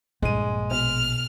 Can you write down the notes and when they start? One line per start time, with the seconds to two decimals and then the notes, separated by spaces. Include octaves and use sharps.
0.22 A#1 G2 G#3 D#7
0.71 B2 F6